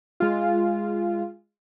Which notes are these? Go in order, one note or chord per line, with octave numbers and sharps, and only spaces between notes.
G#3 F4